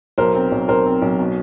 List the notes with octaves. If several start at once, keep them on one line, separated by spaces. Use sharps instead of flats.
B1 A#4 C5
C4
B1
B1 A#4 C5
C4
B1
B2